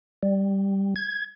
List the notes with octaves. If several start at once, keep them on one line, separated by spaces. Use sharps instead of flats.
G3
G#6